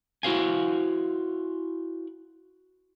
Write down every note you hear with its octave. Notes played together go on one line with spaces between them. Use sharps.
E4 F#4 C5 F5 G#5